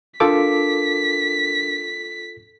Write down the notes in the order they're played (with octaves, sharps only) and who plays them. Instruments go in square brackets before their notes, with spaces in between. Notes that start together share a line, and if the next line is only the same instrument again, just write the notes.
[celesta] D4 A#4 [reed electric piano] F4 A4 D6 [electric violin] B6